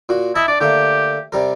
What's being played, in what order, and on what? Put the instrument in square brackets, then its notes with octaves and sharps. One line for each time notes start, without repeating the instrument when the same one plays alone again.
[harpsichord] A#2 F#4
[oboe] E4 [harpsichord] D#5 E5 A5
[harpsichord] D4 [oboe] D5
[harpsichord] D3 A3 A#3 [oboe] G4
[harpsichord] C3 G3 A#4